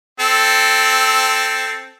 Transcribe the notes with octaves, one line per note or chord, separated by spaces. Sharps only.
C4 A4